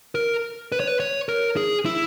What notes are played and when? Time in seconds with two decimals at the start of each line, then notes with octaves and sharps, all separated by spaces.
0.15 A#4
0.72 B4
0.80 C#5
0.87 B4
1.00 C#5
1.29 A#4
1.57 G#4
1.85 E4